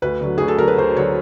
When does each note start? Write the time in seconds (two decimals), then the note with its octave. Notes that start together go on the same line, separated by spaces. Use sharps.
0.02 D2 B4
0.21 D3 F#3
0.38 D2 G#4
0.48 A4
0.58 D3 F#3 A#4
0.68 B4
0.78 D2 C5
0.97 D3 F#3 C#5